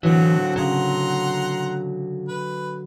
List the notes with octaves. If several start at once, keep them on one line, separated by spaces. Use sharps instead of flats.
D3 E3 F#3 C4 F#5
C#3 F#5 A#5 C6
B4